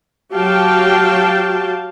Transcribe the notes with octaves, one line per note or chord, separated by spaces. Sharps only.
F#3 F#4 G4 F5 G5 A5